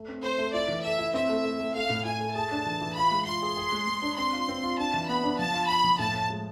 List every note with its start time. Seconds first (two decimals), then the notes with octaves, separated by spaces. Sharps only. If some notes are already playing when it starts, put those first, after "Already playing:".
Already playing: A3
0.08 C4
0.23 A3 C5
0.38 A3
0.53 E4 D5
0.68 E3
0.83 A4 E5
0.99 E4
1.14 C4 E5
1.29 A3
1.45 A3
1.59 A3
1.75 A3 F5
1.90 A2
2.05 E4 G#5
2.21 A3
2.35 G#4 A5
2.51 D4
2.66 E3
2.81 E3
2.96 F4 B5
3.11 G#3
3.26 F4 C6
3.42 G#4
3.57 G#4
3.72 G#3
3.87 G#3
4.02 D4
4.17 C4 C6
4.33 F4
4.48 C4
4.63 F4
4.78 D4 A5
4.94 E3
5.08 B3 B5
5.24 D4
5.39 F3 A5
5.53 F4
5.69 F4 B5
5.84 F3
5.99 A2 A5
6.14 A2
6.30 G#3